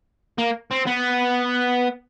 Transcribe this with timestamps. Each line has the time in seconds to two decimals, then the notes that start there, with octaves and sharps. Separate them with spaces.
0.38 A#3
0.71 C4
0.87 B3